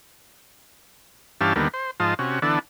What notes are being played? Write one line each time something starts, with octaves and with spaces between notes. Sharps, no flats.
G2 E3 C#4 G4 F5 A5
D#2 D3 G3 A#3 B3
C5
G#2 F3 F4 D#5 A5
C3 C#4 F#4
D3 E3 B3 D4 A4